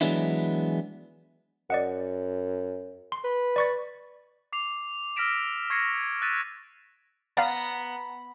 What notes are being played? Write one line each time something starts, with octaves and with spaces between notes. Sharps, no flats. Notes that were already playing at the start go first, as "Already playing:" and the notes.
E3 F#3 G#3 B3 D4 E4
F#2 D5 D#5 F#5
C6
B4
D5 C#6 A6
D6 C7 F7
E6 F6 A#6 B6 D7 E7
C#6 G#6 A#6 C7 C#7
E6 F#6 A6 B6 D#7 E7
B3 D5 F5 A#5